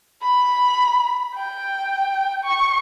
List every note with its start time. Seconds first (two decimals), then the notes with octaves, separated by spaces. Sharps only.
0.23 B5
1.35 G5
2.44 C#6